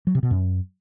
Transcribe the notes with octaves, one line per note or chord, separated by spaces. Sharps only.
F#3
C3
B2
F#2